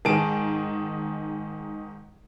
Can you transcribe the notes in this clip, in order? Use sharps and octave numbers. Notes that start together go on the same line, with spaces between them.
G#2 D#3 G#4 A5 D7